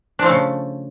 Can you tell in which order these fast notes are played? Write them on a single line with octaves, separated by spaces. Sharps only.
D4 F3 A3 C#3